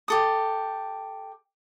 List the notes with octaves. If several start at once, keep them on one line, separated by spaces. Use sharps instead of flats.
G4 A4 D#6